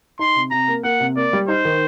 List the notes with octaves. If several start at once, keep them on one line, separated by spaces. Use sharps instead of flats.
D#4 C6
C3
C3 A#5
A#3
A#3 F#5
C3
A#3 D5
G3
D#4 C5
D#3